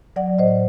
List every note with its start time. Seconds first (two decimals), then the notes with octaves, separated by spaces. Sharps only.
0.16 F#3 D5 F#5
0.38 A2 C5 D#5